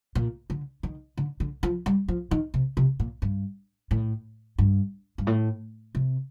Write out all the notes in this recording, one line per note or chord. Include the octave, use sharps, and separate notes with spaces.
A#2
D3
D#3
D3
D3
F3
G3
F3
D#3
C3
C3
A#2
G2
A2
G2
G2
A2
C3